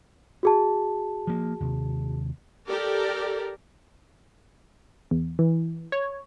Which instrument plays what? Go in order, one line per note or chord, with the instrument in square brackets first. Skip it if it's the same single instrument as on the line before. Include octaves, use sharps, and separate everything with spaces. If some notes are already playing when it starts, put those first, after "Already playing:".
[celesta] F#4 G#4 A5
[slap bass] F3 A#3
D#2 C3
[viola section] G4 A4 A#4 D5
[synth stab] E2
E3
C#5